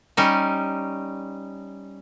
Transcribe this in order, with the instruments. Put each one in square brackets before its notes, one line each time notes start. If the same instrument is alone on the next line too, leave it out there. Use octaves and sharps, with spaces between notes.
[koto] G3 C#4 D#4